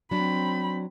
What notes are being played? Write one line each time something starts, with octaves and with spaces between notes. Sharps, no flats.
F#3 C4 D4 B5